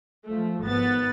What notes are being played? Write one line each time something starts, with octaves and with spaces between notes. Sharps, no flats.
F3 A3
G#1 B3 A6